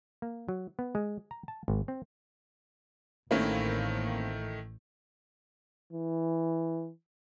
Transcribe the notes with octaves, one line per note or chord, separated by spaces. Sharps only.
A#3
F#3
B3
G#3
A#5
A5
G#1
C4
A1 D#3 A3 A#3 C4 C#4 E4
E3